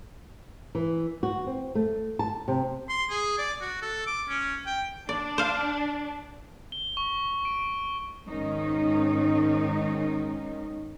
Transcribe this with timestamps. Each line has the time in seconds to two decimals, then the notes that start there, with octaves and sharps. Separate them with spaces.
0.75 E3
1.23 F#4
1.46 C4
1.75 A3
2.19 A5
2.48 C3
2.89 C6
3.10 G#4
3.38 D5
3.61 F#4
3.82 A4
4.07 D6
4.29 C#4
4.66 G5
5.09 D4 D5
5.38 C5 F5
6.72 G7
6.97 C#6
7.45 D7
8.28 G#2 D#3 C#4 D#4